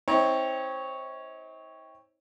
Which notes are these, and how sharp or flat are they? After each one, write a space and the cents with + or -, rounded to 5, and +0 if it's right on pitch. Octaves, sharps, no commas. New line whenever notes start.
C4 +10 D#4 +45 C#5 +0